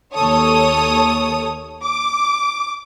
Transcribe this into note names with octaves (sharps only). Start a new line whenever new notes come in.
D#2 A4 C#5 D#6
D6